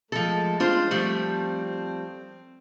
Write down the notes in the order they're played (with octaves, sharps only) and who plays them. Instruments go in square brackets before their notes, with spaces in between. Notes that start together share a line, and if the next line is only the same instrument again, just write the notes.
[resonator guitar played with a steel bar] F3 A4 [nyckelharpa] G#3 A3
[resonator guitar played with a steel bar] D4 F4 C5
[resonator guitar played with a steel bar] F3 G3 A3 [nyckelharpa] C4